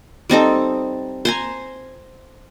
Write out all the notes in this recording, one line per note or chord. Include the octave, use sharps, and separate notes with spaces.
G3 C4 D#4 A4
C5 G#5 A#5